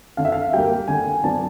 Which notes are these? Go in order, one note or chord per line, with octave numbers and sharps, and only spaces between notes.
D3 F5
E5
F5
G3 A#3 G5
D3 G#5
F#3 B3 D4 A5